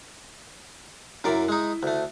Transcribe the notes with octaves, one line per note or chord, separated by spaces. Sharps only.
F#2 E4 A#4 D5 E5
G#3 D#4
D2 A3